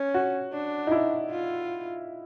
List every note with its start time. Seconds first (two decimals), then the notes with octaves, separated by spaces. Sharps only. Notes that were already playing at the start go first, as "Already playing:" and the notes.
Already playing: C#4
0.14 F#4
0.53 D4
0.87 D#4
0.91 E4
1.30 F4